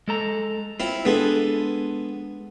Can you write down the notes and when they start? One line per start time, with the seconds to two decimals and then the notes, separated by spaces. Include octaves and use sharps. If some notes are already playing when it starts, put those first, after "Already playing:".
0.08 G#3 A4 A#5
0.80 C4 E4 F4
1.05 G#3 B3 D4 G#4 A4